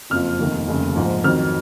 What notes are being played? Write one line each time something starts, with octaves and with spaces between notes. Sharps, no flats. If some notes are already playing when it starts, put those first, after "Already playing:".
F#1 F2 F3 F6
F1 D#2 D#3
F1 D#2 C#3
A#1 G#2 F3
F2 D#3 F#3 F6